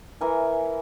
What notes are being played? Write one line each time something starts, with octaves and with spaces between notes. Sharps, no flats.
E3 A#4 G#5